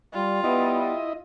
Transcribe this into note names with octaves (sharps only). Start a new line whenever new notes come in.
G3 F4
G3 B3 E4 D#5